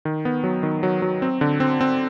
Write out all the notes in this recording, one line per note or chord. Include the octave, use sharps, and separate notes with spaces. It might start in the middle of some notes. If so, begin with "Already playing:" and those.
D#3
B3
F#3
D#3
F#3
F#3
C4
D3
C4
C4